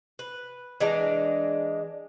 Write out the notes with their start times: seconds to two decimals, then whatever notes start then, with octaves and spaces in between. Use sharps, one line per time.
0.19 B4
0.80 E3 G#3 D4 A#5